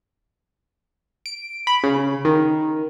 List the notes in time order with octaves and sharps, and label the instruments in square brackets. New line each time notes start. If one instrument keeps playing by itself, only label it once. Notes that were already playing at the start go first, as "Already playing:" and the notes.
[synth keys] D7
B5
C#3
D#3